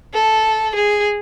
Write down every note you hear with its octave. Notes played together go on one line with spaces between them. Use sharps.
A4
G#4